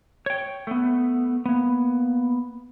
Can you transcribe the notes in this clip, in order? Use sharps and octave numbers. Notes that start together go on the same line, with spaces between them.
C#5 G5
A3 B3
A#3 B3